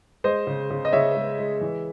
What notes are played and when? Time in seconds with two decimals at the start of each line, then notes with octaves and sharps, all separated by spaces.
0.24 G#3 C5 D#5
0.47 C#3
0.70 C#3
0.85 D#5
0.92 C#3 C#5 E5
1.16 G#3
1.39 G#3
1.61 E3